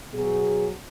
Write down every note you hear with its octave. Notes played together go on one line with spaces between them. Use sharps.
B2 F#3 G#4